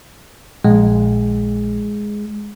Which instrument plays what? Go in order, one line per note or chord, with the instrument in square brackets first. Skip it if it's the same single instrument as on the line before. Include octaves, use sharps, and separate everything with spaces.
[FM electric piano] A#1 [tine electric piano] G#3